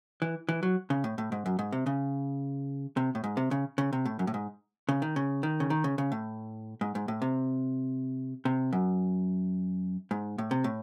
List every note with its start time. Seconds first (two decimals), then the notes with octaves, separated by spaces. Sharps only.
0.22 E3
0.49 E3
0.63 F#3
0.90 C#3
1.04 A2
1.18 A2
1.32 G#2
1.46 F#2
1.59 G#2
1.72 C3
1.86 C#3
2.97 C3
3.15 A2
3.24 G#2
3.37 C3
3.51 C#3
3.78 C#3
3.93 C3
4.06 A2
4.19 F#2
4.27 A2
4.34 G#2
4.89 C#3
5.02 D#3
5.16 C#3
5.43 D#3
5.60 C#3
5.70 D#3
5.84 C#3
5.98 C#3
6.12 A2
6.81 G#2
6.95 G#2
7.08 A2
7.22 C3
8.45 C3
8.73 F#2
10.11 G#2
10.38 A2
10.51 C3
10.64 A2